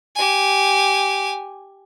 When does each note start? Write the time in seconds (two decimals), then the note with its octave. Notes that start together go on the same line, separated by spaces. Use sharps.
0.16 G4 G#5